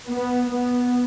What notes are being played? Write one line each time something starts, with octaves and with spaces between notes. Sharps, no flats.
B3
B3